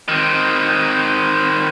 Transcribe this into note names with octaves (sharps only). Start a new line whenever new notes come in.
D#3 C4